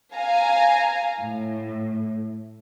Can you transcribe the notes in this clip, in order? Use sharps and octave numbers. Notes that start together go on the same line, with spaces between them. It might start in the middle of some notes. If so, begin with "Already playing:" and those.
F5 G#5 A#5
A2